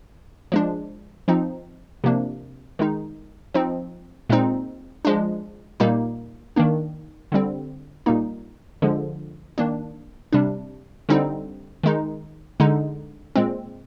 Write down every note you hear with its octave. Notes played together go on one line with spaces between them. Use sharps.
F3 G#3 D4
F3 C4 D#4
C3 F3 A#3 D4
D#3 G#3 D#4
F3 C4 D#4
A#2 G#3 C4 D#4
F3 G#3 D4
A#2 G3 A#3 D#4
D#3 A#3 D4
D3 G3 C4
A#2 G3 A#3 D#4
D3 F3 G#3
D#3 A#3 D4
C3 G3 D4
D3 G3 C4 D#4
D#3 G#3 D#4
D3 G#3 D#4
A#2 G#3 C4